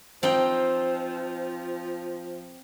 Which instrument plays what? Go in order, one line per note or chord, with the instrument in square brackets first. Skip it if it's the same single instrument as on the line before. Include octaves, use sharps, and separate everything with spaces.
[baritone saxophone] F3 [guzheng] C4 D#4 G5